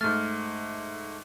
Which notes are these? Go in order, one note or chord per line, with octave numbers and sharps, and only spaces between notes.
G#2 A3 F6 A6